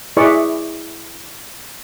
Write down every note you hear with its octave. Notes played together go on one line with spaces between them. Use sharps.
E4 G#4 B4 D5 E5 C#6